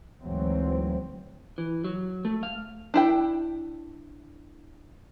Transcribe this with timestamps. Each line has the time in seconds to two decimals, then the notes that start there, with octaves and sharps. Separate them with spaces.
0.22 D2 G#2 E3 F#3 C4
1.58 E3
1.84 F#3
2.25 A3
2.43 F5
2.94 D4 E4 G5